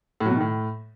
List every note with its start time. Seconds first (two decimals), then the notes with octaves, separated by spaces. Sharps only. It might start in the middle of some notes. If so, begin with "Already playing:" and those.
0.20 A2
0.26 F#3
0.31 B2
0.36 D#3
0.41 A2